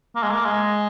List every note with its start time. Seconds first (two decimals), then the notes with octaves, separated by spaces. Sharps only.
0.16 A#3
0.23 G#3
0.31 A#3
0.45 G#3